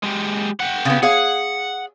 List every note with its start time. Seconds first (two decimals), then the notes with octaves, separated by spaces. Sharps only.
0.04 G#3 G4
0.60 G4 F#5
0.85 C#3 B3
1.03 G#4 C#5 F5 F#5